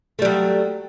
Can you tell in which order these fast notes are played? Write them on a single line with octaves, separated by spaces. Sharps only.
A3 G3 F#3